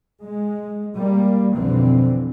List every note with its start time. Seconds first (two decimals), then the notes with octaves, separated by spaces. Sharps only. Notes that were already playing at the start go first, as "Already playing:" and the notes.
0.22 G#3
0.96 G3 A#3
1.53 B1 F2 B2 D3 E3 C4